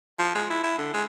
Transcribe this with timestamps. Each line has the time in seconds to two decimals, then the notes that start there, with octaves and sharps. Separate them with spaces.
0.19 F3
0.35 G#3
0.50 E4
0.63 E4
0.78 D3
0.94 G#3